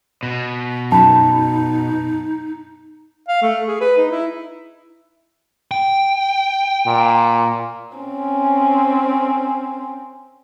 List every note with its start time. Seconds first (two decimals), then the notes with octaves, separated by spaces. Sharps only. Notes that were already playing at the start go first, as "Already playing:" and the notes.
0.23 B2
0.92 F#2 D#4 A5 B5
3.28 F5
3.42 A3
3.68 G#4
3.81 B4
3.97 D#4
4.11 E4
5.71 G5
6.87 A#2
7.97 C4 C#4